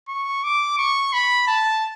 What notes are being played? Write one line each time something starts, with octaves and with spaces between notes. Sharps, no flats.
C#6
D6
C#6
B5
A5